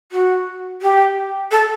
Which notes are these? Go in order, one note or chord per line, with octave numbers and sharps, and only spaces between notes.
F#4
G4
A4